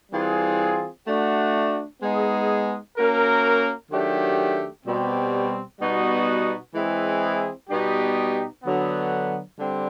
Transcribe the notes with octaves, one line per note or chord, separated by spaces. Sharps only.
E3 G3 C4 F4 G#4
A3 D4 F#4
G#3 B3 D#4 G#4
A#3 C#4 F#4 A#4
D#3 F#3 A3 D4 G4
B2 G3 C4
B2 G3 B3 D#4 F#4
E3 G#3 C4 E4 G#4
B2 G3 B3 D#4 G4
D3 F#3 B3
D3 G3 C4